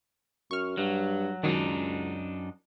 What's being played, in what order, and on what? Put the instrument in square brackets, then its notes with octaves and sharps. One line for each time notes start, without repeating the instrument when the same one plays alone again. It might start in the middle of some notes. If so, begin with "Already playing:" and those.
[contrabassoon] F#2 [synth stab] C#6 F6
[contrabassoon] G2 [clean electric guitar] F#3
[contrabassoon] C#2 [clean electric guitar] F#2 D4 D#4 [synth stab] D#3 F#3